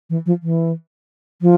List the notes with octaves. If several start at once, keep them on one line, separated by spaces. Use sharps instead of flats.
E3
F3
E3
F3